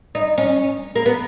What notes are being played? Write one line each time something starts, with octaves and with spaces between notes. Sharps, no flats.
D#4
C#4
A#3
B3